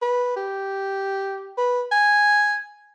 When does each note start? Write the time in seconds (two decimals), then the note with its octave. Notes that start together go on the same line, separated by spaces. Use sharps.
0.02 B4
0.36 G4
1.58 B4
1.92 G#5